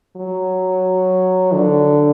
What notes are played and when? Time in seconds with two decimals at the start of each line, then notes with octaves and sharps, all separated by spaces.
0.17 F#3
1.54 D3